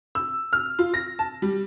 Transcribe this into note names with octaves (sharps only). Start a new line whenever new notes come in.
E6
F6
F4
A#6
A5
G3